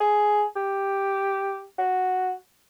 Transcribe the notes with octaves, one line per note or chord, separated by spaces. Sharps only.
G#4
G4
F#4